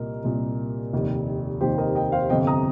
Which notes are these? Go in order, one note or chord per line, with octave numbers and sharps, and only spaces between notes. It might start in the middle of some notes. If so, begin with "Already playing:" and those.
Already playing: C2 A#2 A#4 D#5
C2 A#2
F1 D#2 D#3
F1 D#2 D#3 G4 C5
A#4 D#5
D#5 G5
C5 F5
G1 F2 C3 D#5 G5
A#5 D#6